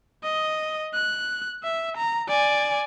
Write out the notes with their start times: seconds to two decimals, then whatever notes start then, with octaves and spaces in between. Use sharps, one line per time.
0.24 D#5
0.94 F#6
1.64 E5
1.98 A#5
2.28 D5 G#5